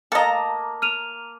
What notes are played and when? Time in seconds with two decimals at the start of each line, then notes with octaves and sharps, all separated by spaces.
0.12 A#3 A4 D#5 A5 A#5
0.82 F6 D#7 F7